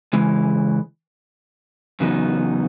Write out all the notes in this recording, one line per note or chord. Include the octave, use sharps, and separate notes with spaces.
C#3 E3 G#3
E2 C#3 F#3 B3 D#4